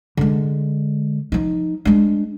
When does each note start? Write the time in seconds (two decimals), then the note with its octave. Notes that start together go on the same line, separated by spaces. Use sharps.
0.17 D3 G#3
1.32 F3 D#4
1.85 G#3 D4